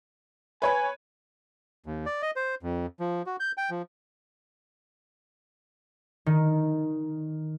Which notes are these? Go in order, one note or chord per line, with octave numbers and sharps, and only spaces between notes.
B4 C#5 G#5 B5
D#2
D5
D#5
C5
F2
F3
F#4
G6
G5
F3
D#3